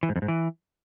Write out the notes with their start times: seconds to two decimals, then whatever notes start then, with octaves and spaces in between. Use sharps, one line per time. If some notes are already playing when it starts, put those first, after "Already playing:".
0.03 E3
0.09 G#2
0.16 F2
0.22 G#2
0.28 E3